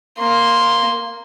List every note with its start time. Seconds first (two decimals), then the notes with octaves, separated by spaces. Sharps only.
0.18 A#3 C6